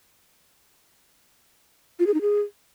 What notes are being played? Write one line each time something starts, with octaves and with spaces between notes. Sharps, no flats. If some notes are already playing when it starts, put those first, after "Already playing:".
F4
G#4
D#4
G#4